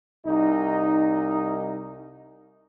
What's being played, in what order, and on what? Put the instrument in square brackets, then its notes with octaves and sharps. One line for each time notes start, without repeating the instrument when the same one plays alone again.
[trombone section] C2 D#4